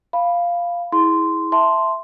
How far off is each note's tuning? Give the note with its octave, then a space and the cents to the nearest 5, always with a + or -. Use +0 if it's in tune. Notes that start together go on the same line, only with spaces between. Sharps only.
F5 -5 B5 +0
E4 -20 G#4 +0 C6 -10
E5 +0 A5 +0 C6 +0